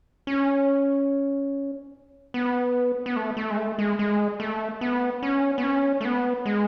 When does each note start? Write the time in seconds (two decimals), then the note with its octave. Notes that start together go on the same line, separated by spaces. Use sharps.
0.27 C#4
2.34 B3
3.06 B3
3.16 A3
3.37 A3
3.50 G#3
3.58 A3
3.79 G#3
3.99 G#3
4.40 A3
4.81 B3
5.23 C#4
5.58 B3
5.64 C#4
6.01 A3
6.05 B3
6.46 G#3